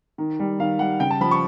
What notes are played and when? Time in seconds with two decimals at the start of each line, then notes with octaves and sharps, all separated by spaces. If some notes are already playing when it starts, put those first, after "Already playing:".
0.18 D#3
0.39 G3
0.59 D#3 F5
0.79 G3 F#5
1.00 C#3 G5
1.11 A5
1.21 F3 B5
1.31 C#6